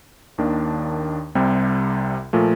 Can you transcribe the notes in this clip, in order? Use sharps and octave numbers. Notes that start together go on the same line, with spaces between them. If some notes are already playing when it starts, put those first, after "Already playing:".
D#2 D#3 A#3 D4
C2 C3 G3
A#2 F3 A3